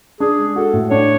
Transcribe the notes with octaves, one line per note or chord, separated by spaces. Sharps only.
D4 G#4
G#3
F#4 A4
A2
D4 C#5